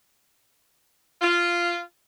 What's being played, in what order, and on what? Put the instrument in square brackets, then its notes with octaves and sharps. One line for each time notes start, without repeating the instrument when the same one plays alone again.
[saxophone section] F4